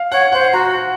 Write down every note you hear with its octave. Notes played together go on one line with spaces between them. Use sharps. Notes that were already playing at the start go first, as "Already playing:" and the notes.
Already playing: F5
C#5 F#5
C5 F#5
F#4 A#5